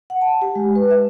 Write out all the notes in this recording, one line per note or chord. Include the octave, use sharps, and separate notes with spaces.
F#5
A5
G4
G#3
B4
E5